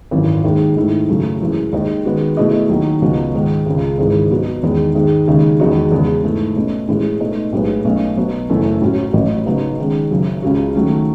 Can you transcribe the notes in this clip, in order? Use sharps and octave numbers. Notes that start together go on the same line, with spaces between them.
G#1 F#2 E3
D#2 D#3 G#3
G#2 D#3 A3 E4
F#2 C#3 F#3 A3 C#4
F#2 E3 G#3
D#2 D#3 G#3 D#4
D#3 G#3 B3 F#4
B2 A3 E4 G#4 D#5
D#2 D#3 F#3
C#2 B2 F#3
G#2 D#3 G#3
C#2 C#3 G#3
G#1 G#2 E3 G#3
B2 F#3 B3 F#4
E2 D#3 G#3 D#4
G#2 D#3 G#3
D#2 C#3 G#3 D#4 G#4
E2 D#3 G#3 D#4 F#4
E2 C#3 G#3
G#2 E3 A3
B2 A3 C#4
A2 E3 G#3
B2 A3 D#4
B1 A2 G#3 B3
B1 B2 A3 C#4
B2 F#3 B3
F#1 F#2 E3 A3
A2 F#3 C#4 F#4
A1 A2 F#3
C#3 F#3 B3 D#4
D#3 G#3 C#4
F#1 F#2 C#3 F#3
C#2 C#3 G#3 C#4 F#4
D#3 F#3 A3 C#4